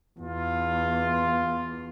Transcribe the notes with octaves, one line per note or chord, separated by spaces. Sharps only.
E2 F4